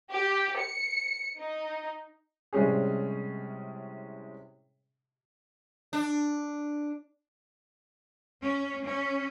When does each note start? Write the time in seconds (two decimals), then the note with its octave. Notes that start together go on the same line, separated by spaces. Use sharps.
0.10 G4
0.59 C#7
1.37 D#4
2.53 A2 C3 G3 G#3 C#4 G#4
5.93 D4
8.42 C#4
8.86 C#4